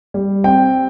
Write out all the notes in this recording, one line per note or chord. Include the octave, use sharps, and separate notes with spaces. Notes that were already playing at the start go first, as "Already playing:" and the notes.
G3
C4 G5